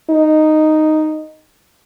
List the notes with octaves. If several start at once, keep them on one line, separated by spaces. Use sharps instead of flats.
D#4